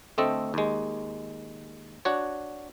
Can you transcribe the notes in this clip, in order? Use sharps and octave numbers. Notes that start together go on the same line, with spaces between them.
D2 A3 C4 A4 D#5
D#2 G#3
D4 F#4 C#5